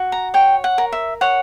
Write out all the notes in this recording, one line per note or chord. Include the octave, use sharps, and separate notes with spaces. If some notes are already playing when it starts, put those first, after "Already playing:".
Already playing: F#4
A#5
C#5 G5
F#5
A#4
E5
C#5 F#5